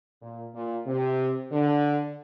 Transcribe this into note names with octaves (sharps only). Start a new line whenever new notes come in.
A#2
A#2
C3
D3